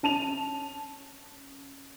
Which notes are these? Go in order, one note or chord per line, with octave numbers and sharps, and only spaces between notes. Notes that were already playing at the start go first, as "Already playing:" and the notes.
C#4 A5 D#7 F7